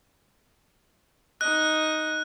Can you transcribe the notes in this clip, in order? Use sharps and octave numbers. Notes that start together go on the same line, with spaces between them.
D#4 D#5 F#6